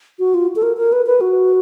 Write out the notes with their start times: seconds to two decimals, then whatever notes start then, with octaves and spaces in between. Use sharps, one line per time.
0.19 F#4
0.34 F4
0.56 A4
0.63 A#4
0.77 A#4
0.92 B4
1.06 B4
1.21 F#4